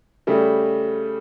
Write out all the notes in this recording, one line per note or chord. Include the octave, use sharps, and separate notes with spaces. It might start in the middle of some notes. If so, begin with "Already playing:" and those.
C#3 G3 A3